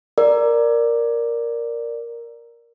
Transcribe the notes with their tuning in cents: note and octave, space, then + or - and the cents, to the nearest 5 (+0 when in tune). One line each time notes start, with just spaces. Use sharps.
A#4 +0 D5 +0